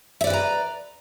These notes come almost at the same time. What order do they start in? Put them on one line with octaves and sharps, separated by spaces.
E5 D5 B4 G5 A#5